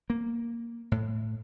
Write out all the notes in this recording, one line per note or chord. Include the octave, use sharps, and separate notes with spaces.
A#3
A2